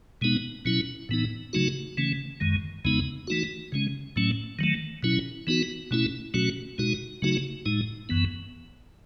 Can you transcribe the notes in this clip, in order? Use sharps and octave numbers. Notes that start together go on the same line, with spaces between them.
B2 G#3 B3 D#4
B2 F#3 C#4 E4
A2 E3 B3 D#4
C#3 F#3 A3 D#4 F#4
C#3 E3 A3 C#4
F#2 D#3 G#3
E2 C#3 G#3 B3 D#4
E3 A3 D#4 F#4
C#3 G#3 C#4
A2 F#3 A3 C#4
D#3 F#3 A3
B2 F#3 C#4 E4
E3 B3 D#4 F#4
B2 A3 C#4 E4
B2 F#3 A3 C#4 F#4
B2 G#3 D#4 F#4
C#3 F#3 A3 D#4 F#4
A2 G#3 D#4
F#2 E3 B3